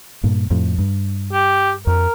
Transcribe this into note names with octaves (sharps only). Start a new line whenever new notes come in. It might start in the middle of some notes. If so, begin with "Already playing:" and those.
G2 A#2
F2 A2
G2
G4
F2 A#4